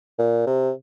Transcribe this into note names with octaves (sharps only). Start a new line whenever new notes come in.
A#2
C3